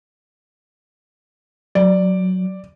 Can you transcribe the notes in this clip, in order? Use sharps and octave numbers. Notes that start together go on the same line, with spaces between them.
F#3 D5